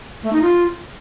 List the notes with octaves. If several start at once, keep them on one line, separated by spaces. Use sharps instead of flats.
A3
D#4
F4